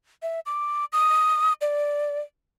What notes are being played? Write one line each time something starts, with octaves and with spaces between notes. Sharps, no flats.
E5
D6
D#6
D5